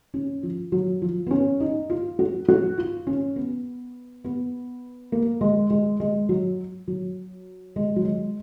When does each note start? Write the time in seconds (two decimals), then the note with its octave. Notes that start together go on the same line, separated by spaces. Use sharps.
0.14 C#4
0.43 F3
0.72 F#3
1.02 F3
1.27 B3
1.31 C#4
1.60 D#4
1.90 F4
2.19 F#4
2.49 F#4
2.78 F4
3.07 C#4
3.36 B3
4.24 B3
5.12 A#3
5.41 G#3
5.70 G#3
6.00 G#3
6.29 F#3
6.88 F#3
7.76 G#3
7.96 F#3
8.05 G#3